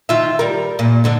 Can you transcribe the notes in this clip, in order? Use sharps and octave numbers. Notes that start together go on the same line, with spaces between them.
D#3 F4 E5
G3 A#4
A#2
G#2 D3 D4